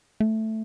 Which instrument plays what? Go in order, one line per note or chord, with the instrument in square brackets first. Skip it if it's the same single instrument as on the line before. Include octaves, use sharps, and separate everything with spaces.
[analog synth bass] A3